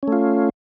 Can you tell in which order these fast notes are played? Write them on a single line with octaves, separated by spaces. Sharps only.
C#4 A3 F4